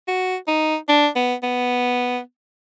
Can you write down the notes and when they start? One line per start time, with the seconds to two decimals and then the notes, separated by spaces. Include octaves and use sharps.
0.08 F#4
0.48 D#4
0.89 D4
1.16 B3
1.43 B3